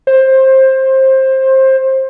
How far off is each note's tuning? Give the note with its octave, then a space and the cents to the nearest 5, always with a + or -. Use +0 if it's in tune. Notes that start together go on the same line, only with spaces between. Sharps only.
C5 +20